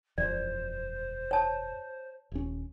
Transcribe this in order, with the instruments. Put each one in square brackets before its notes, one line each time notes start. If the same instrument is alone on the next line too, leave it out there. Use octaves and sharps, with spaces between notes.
[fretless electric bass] E1 F#2 F3 [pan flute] C5 [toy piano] D5
[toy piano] C#5 A5
[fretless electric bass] D#1 C#4